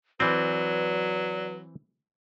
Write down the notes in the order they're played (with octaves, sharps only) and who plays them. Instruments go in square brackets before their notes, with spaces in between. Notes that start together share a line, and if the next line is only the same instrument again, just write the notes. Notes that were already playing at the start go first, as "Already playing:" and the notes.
[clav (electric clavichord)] E3 C4 [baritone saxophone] F#3 [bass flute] B4 [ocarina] D5